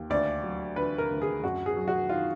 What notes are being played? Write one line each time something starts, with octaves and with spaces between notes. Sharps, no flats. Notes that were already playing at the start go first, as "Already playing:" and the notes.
Already playing: D#2
D2 D5
F#3
D3 B4
A#4
D2
G#4
F#2 F#4
G#4
F#3
F#4
D#3 F4